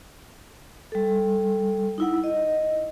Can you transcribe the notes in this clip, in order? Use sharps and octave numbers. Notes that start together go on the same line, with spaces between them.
G3 A4
D#4 E4 F#5
D#5